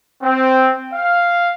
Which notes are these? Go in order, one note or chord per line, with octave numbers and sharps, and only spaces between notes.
C4
F5